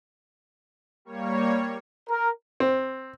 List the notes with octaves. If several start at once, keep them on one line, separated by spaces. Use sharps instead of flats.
G3 A#3 C#5
A#4
C4